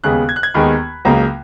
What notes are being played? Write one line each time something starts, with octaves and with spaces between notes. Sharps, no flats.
D#2 C#3 G#3 B3 F#6
G#6
F#6
G#6
D#2 D#3 G#3 B3 B5
C#2 C#3 F#3 A#3 A#5